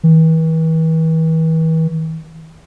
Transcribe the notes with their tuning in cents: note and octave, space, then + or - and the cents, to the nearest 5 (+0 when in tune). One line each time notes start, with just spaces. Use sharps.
E3 -40